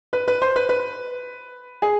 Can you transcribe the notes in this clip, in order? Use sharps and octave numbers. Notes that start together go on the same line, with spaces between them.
B4
B4
C5
B4
B4
G#4